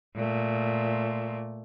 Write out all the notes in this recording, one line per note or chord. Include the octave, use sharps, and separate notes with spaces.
A#2 A3